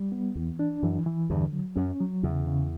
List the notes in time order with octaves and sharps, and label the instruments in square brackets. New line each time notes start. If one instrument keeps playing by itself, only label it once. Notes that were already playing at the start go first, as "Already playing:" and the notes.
Already playing: [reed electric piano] G3
B3
[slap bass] E2 [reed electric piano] E3
[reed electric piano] D4
[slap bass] F#2 [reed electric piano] E3
[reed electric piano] E3
[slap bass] E2 G2 [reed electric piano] D3
[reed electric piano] F#3
[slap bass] F#2 [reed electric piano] C#4
[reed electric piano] F#3
[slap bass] E2 [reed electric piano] C#3
[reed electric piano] C#3